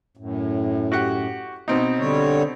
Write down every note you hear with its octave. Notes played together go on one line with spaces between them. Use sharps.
F#2 A2
F#4 G4 F#5
B2 C4 D#4
D3 G3 C#5